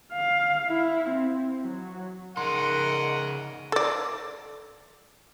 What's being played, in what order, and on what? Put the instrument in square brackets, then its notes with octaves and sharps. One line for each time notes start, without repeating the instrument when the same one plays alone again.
[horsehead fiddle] F5
E4
C4
F#3
[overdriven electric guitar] C#3 D#4 [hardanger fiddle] A#4 D#5 [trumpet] F#5 [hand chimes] C6
[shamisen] A4 D5